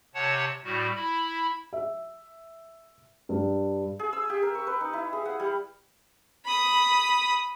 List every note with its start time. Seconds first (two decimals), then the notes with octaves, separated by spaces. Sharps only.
0.14 C3 C#5 F#5 A5
0.64 A2 G3 F#4
0.95 E4 B5
1.73 E5
3.29 G2
3.99 G#4
4.13 E6
4.30 G4
4.43 A#4
4.55 C#6
4.67 B4
4.81 D#4
4.93 E4
5.13 G#4
5.25 F#5
5.40 G3
6.45 B5 D#6